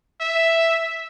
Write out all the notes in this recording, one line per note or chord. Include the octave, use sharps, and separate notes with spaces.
E5